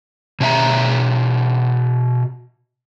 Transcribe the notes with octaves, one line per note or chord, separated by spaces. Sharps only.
B2 C#5 E5 A#5